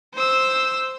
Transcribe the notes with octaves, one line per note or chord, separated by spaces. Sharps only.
C5 E6